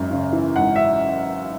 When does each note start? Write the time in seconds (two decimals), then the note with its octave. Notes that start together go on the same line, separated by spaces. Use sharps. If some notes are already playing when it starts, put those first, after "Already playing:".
Already playing: G#1 F#2
0.10 C#3
0.33 E3
0.56 G#1 F#5
0.76 E5